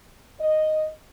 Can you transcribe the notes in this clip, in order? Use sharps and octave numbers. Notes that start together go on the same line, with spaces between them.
D#5